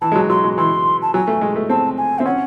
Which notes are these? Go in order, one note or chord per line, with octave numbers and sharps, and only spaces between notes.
E3 A5
G#3
F#3
F#3 C6
G#3
E3 C6
A5
F#3 G#5
A3
G#3
A3
C4 A5
G#5
C4 E5
C#4 F#5